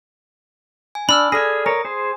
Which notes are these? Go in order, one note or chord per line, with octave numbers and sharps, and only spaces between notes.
G#5
D4 B5 E6 F6
G#4 A4 D5 G#5 F6 A#6
A#4 C#5 D#6
G#4 C5